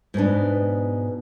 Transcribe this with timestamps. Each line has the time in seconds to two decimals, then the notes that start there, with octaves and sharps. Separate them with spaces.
0.14 G#2 B2 B3 D4